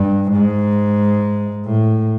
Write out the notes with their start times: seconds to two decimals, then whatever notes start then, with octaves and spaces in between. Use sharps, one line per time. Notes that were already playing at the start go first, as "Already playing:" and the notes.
Already playing: G2
0.32 G#2
1.66 A2